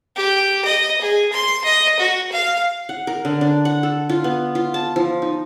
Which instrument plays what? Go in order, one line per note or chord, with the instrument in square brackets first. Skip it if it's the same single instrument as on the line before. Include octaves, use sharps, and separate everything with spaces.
[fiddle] G4
D#5
G#4
C6
D#5
F#4
F5
[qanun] F#5
A#4
D3
D4
F#5
A4
F4
B3
F4
A5
F3
D#4